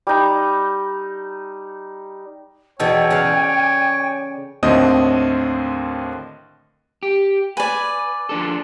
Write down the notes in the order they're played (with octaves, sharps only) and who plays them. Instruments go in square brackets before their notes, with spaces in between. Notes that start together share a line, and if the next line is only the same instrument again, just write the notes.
[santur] G3 D#4
[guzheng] E2 B2 A4 [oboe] C#5 [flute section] D5 G5 G#5
[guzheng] C#3 F5
[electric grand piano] D#2 A2 D3 C4 D#5 D#6
[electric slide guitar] G4
[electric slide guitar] B4 [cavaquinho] D5 G#5
[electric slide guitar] F3 D4 A4